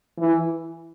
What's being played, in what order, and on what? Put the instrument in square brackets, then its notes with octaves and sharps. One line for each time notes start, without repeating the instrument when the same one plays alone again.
[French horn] E3